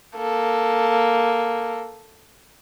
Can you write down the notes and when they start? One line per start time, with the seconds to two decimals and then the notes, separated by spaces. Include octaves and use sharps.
0.17 A#3 A4